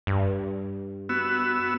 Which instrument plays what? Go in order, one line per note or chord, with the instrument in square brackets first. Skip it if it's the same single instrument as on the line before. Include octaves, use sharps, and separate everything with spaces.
[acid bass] G2
[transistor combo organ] B3 F#4 E6